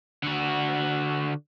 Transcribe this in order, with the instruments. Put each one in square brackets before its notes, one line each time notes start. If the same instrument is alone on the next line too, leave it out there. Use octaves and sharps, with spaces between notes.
[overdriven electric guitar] D3 F#4